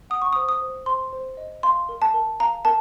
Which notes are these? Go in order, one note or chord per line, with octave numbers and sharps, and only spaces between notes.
F#5 D#6
C#6
C5 D#6
D#6
C5
C5 C6
C5
D#5
F5 C6
A#4
A5
A#4
F5 A#5
A#4 A5